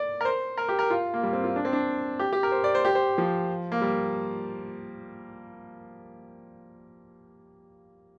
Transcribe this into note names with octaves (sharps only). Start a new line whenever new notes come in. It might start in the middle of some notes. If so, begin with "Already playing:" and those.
Already playing: D5
A#4
C5
A#4
G4
A#4
F4
A#3
G3
C4
F4
D4
C4
D4
G4
G4
A#4
C5
D5
C5
G4
C5
F3
A#3
G3